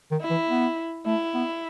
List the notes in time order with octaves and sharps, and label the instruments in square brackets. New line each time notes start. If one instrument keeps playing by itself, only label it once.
[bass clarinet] D#3
[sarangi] E4
[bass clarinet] E3
B3
[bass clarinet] A3 [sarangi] E4
[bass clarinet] B3